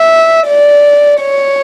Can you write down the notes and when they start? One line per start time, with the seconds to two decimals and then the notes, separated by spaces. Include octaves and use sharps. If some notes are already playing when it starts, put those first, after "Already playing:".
Already playing: E5
0.48 D5
1.22 C#5